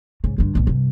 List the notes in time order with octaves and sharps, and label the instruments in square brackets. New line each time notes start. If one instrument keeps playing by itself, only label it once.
[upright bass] G#2 C#3
G2 D3
B1 A#2
G2 C3